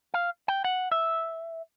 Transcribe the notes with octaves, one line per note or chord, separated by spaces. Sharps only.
F5
G5
F#5
E5